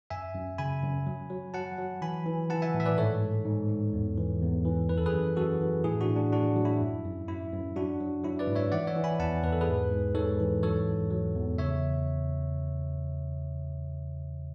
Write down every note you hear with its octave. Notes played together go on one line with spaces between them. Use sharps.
F#2 E5 G#5
F#2
C#3 G#5 B5
F#2
F#3
F#3
F#3 F#5 A5
F#3
E3 G#5 B5
E3
E3 F#5 A5
E5 G#5
A2
E5
B4 D5
G#2 A4 C#5
G#2
G#2
G#2
E2
E3
E2
E3
F#2 B4
A4
G#4 B4
F#2
F#2 F#4 A4
E3
A2 E4 G#4
D4 F#4
A2
D4
A2 D4 F#4
F#3
E4
F#2
F#2
F#2 E4
F#2
F#3 D4 F#4
F#3
F#3 E4
B4 D5
G#2
C#5 E5
E3 D5 F#5
C#5 E5
E3
G#5 B5
E2 F#5 A5
E2 B4
A4
G#4 B4
G#2
G#2
G#2 A4 C#5
E3
F#3 A4 C#5
E2
F#3
E2
C#3 C#5 E5